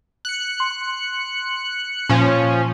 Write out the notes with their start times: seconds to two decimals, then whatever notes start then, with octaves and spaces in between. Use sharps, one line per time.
0.25 F#6 C#7
0.60 C6
2.09 A#2 F3 C#4